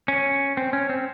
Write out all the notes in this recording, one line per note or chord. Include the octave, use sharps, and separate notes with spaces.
C#4
C4
C#4
C4